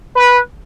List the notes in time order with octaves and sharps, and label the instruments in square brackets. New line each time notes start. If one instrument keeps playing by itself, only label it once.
[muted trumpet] B4